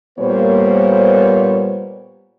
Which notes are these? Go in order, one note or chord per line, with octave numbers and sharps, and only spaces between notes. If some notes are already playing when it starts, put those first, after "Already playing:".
A#2 G3 A#3 B3 C5 C#5